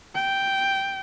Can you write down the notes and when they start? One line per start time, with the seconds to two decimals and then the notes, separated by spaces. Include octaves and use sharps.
0.15 G5